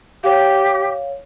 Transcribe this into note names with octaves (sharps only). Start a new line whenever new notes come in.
G4 C#5 F5